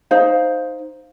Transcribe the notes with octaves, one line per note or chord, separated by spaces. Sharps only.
D#4 C5 F5